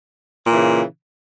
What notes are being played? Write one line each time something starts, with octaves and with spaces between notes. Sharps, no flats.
A#2 C#3 E3